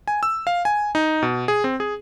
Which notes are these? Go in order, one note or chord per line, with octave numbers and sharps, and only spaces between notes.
G#5
E6
F5
G#5
D#4
B2
G#4
C4
G#4